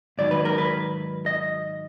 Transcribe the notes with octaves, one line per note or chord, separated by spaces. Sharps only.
G#2 D#3 F#3 D5
B4
A#4
B4
D#5